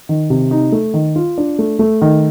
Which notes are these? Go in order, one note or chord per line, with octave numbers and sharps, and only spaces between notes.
D#3
C3
D#4
A3
D#3
F4
D4
A3
A3
D#3